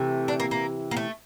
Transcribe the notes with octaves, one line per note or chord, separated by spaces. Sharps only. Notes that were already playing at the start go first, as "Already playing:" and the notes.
Already playing: C3 E3 A3
D4
A#3
A#3
A#3
A3